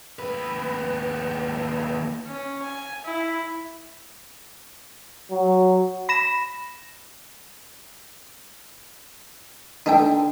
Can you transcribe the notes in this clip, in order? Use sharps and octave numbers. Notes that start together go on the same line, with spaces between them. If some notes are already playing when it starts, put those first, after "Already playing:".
D#2 B4
C#4
G#5
E4
F#3
B5 A#6 E7
D3 D#4 A4 G5